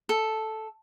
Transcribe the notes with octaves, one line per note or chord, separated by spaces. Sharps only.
A4